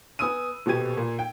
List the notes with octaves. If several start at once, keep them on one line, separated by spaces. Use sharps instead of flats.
B3 G#5 D#6 E6 D#7
D#1 B2 B3 G4 G#6 D#7
A#2
G5